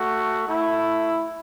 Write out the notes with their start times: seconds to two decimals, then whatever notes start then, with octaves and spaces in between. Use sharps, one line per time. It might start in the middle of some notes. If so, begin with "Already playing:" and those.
Already playing: A3 F#4
0.48 A3 E4